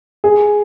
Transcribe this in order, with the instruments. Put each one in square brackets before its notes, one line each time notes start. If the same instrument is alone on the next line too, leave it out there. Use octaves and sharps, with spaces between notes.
[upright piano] G#4